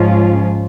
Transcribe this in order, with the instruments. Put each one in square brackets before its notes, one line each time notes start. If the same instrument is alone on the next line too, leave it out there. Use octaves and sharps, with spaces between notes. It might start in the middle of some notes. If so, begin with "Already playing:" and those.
Already playing: [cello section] G#2 F3 G#3 C#4 F4